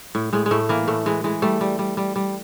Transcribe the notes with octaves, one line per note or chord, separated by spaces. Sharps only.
A2
A2 G#3
G#3
A2 A3
E3 A#3
A2 A3
E3 G#3
E3 G#3
G3 A3
G3
G3
G3
G3